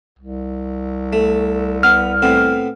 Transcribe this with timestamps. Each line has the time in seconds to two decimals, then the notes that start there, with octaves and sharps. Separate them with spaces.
0.19 C2
1.13 A3
1.83 B3 F6
2.22 A2 B3 C4